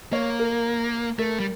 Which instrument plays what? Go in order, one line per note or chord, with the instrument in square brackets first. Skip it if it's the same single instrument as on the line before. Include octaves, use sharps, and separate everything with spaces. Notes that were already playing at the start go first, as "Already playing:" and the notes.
[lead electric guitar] A#3 [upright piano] C#5
[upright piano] A#4
[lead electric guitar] A3 [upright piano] A#4
[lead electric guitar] G3